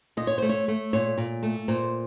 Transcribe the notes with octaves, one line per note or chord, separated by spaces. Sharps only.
A#2 D#5
C#5
A3 C5
C#5
A3
A#2 C#5
A#2
A3
A#2 C5